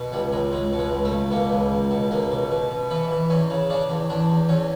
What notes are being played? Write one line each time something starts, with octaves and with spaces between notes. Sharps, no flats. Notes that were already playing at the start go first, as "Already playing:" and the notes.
Already playing: B2
C#2 G3
C#2 G#3
C#2 G#3
B2
G#3
C#2
A3
C#2
B2 A#3
C#2
C#2
B2
C#2 A#3
B2
B2
B2
E3 B3
E3
E2 C#4
C#3
C#3 D4
E2
E2 D4
E2
E2 C#4